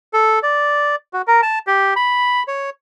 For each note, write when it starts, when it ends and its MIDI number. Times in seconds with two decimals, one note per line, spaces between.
0.13 0.39 69
0.43 0.96 74
1.13 1.22 66
1.27 1.41 70
1.43 1.59 81
1.67 1.94 67
1.96 2.43 83
2.48 2.70 73